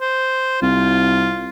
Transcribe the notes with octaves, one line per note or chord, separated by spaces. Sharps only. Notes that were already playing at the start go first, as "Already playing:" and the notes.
C5
C2 F4